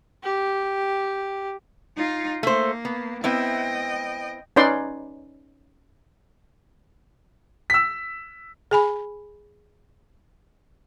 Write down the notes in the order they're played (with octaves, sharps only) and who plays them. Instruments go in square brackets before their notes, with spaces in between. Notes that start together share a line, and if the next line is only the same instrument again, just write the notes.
[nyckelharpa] G4
[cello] D#4 F4
[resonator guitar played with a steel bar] A3 C5 [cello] A#3
[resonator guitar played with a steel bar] B3
[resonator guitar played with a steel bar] B3 C4 E4 [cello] D#5 G5
[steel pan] C#4 D#4 B4 D5 C6
[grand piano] E6 B6
[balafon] G#4 G#5 B5